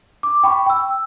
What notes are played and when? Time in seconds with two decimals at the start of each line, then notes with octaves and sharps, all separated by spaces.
0.23 D6
0.43 G5 B5 C#6
0.66 G5 E6